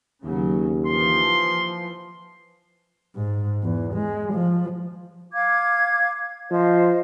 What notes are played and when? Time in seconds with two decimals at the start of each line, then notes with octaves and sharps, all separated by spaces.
0.25 D#2 C#3 F#3
0.87 E3 F3 C6
3.16 G#2
3.63 E2
3.94 G#3
4.33 F3
5.33 F5 D6 G#6
6.51 F3 C5 D#5